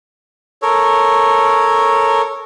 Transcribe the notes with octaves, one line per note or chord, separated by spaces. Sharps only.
A4 A#4 C#5